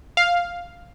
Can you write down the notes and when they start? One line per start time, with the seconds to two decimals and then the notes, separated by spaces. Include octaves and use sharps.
0.17 F5